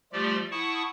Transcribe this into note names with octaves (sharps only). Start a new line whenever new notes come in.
F3 G3 A3 F4 G4 D5
E4 F#5 A5 C#6 D#6